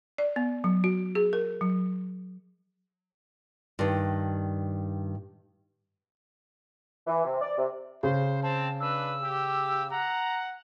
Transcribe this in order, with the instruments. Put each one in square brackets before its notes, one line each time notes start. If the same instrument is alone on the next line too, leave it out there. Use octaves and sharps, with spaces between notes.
[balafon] D5
B3
F#3
F#4
G#4
A#4
F#3
[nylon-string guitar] G2 D#3
[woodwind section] E3
C3
D5
C3
[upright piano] C#3 [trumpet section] C5
[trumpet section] C4 [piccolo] A5
[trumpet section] D4 B4 [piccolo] E6
[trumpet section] G4
[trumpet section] F#5 [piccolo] A#5